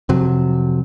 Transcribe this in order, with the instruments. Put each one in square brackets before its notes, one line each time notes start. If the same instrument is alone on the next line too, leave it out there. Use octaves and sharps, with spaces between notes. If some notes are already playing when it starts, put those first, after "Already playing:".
[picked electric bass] F2 C3 F#3